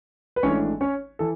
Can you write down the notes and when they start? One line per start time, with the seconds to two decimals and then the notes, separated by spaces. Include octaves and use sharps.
0.36 B4
0.43 G#1 G#2 E3 A3 C#4 D4 C#5
0.81 C#4 C#5
1.19 E3 A4